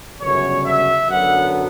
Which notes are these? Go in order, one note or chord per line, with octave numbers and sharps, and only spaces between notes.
G1 F#2 C#3 C#5
E5
F#2 D3 F#3 B3 F#5